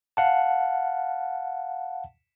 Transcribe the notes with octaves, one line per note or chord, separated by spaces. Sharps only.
F5 F#5 A5